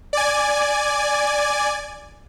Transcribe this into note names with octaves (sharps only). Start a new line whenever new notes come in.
D5 G#5